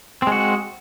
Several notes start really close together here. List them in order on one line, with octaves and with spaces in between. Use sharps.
C4 G#3 F#4